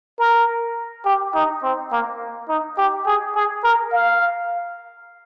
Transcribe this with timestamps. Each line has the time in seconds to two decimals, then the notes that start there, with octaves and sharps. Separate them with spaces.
0.19 A#4
1.05 G4
1.35 D#4
1.63 C4
1.92 A#3
2.48 D#4
2.78 G4
3.06 G#4
3.35 G#4
3.64 A#4
3.92 F5